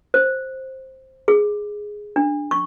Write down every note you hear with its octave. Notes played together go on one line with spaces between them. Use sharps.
C5
G#4
D4
C#6